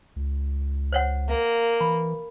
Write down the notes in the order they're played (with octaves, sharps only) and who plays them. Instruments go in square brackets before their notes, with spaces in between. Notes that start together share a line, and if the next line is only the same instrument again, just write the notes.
[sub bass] C#2
[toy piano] C5 C#5 F#5
[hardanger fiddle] A#3
[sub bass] E3 [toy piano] B5